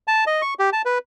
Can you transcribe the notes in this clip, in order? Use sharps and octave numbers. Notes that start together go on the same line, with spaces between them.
A5
D#5
C#6
G4
A5
B4